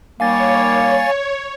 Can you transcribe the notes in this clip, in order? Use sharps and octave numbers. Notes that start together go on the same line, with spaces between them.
D#3 G3 A#3 C#5 F5 G#5 A6